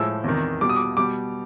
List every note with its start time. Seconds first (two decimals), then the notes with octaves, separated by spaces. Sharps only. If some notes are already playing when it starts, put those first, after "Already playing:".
Already playing: A2 F3 G#3 E6
0.24 E2 C3 D#3
0.61 B2 G3 D6
0.69 D#6
0.76 D6
0.97 B2 G3 D6